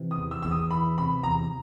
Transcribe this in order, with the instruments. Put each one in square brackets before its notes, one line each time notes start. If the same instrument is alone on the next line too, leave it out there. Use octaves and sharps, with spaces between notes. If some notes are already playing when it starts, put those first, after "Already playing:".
Already playing: [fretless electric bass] C3 E3
[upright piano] D#6
[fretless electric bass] E2
[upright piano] E6
[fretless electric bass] E2 [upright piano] E6
[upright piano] D#6
[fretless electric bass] E3 [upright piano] B5
[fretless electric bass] C3 [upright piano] B5
[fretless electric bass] E2 [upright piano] A#5